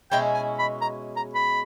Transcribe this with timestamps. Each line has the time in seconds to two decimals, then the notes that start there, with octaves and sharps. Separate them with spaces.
0.11 B2 G#3 C#4 E4 G5
0.34 G#5
0.59 B5
0.81 A#5
1.17 A#5
1.35 B5